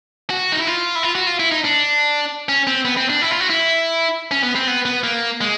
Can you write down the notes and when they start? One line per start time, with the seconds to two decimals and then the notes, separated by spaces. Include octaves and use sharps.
0.30 F#4
0.52 D#4
0.59 E4
0.67 F4
0.95 E4
1.03 F4
1.15 F#4
1.27 F4
1.40 E4
1.51 D#4
1.64 D4
2.49 C#4
2.67 C4
2.85 B3
2.97 C4
3.10 D4
3.22 E4
3.31 F4
3.40 F#4
3.50 E4
4.31 C#4
4.43 B3
4.55 C4
4.67 B3
4.86 B3
5.04 A#3
5.41 G#3